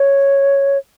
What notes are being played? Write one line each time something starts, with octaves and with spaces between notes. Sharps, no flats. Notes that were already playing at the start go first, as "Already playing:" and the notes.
Already playing: C#5